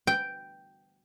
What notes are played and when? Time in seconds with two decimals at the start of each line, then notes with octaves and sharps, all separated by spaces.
0.07 G5